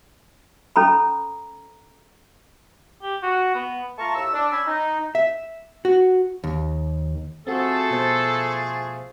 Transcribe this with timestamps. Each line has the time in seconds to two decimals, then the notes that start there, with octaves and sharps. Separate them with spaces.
0.76 C#4 A4 A#5 B5
3.02 G4
3.22 F#4
3.55 B3
3.98 A3 F4 A5 A#5 C#6
4.15 D#2 E4 E6
4.33 D4
4.51 C#4 G#5 B5 E6
4.67 D#4
5.15 E5
5.85 F#4
6.44 D#2
7.47 F3 A3 C4 F#4 G#4 A4
7.91 B2 C5 A6